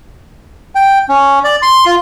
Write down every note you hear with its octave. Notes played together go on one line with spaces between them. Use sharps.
G5
C#4
D5
C6
F4